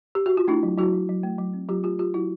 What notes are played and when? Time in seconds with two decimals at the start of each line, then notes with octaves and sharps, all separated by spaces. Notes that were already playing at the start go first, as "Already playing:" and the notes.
0.15 G4
0.26 F#4
0.37 F4
0.48 A3 D4 E4
0.63 F#3
0.78 F#3 E4 F#4
0.94 F#3
1.09 F#3
1.23 A3
1.39 F#3
1.54 C4
1.69 F#3 F4 G4
1.84 A3 F4 G4
1.98 F#3 F4 G4
2.14 F#3 E4 F#4